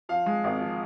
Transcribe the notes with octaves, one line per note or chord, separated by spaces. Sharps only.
F3 F5
G#3
G#1
F3